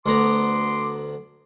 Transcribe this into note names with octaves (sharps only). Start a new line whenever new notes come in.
D2 B3 A#5 C6 D6